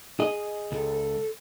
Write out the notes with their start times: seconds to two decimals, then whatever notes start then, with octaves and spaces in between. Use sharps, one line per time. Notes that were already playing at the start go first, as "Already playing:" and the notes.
0.20 G#4 D#5
0.72 C#2 A4